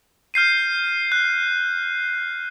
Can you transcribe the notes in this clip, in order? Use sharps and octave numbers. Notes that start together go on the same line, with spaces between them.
F6 G6 C7 D#7
F#6